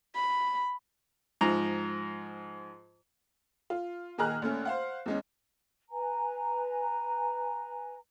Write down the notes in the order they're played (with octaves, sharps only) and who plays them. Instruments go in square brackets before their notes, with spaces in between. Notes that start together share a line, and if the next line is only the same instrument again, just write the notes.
[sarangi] B5
[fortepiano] G#2 F3 A#5
[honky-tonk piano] F4
A#2 D#3 G#4 A#5 F6 F#6
A#1 A3 C#4
C5 F5 F#5
E2 G#3 C#4
[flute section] B4 G#5 A#5